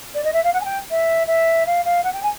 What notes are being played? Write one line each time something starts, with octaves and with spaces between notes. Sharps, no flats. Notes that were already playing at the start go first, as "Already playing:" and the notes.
D5
D#5
E5
F5
F#5
G#5
G5
E5
E5
F5
F5
F#5
G5
G#5